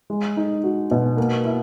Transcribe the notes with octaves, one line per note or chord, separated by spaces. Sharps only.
G#3
D#4
F#4
B2
A#3
E4